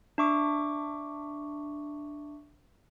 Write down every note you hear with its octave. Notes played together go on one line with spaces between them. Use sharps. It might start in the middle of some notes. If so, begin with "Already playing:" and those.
D4 E5 C#6 D6